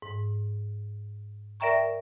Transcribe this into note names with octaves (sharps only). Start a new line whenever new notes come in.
G#2
A#4 D5 E5 G5 A#5 C#6